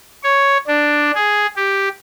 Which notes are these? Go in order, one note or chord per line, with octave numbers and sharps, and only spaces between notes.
C#5
D4
G#4
G4